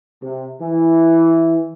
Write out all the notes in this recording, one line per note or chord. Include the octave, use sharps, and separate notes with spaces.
C3
E3